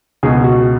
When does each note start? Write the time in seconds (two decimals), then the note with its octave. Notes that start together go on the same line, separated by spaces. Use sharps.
0.23 C#2 B2 G#4
0.44 F#4